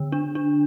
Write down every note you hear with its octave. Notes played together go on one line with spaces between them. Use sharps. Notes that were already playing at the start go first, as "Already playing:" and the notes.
Already playing: D3
D4
D4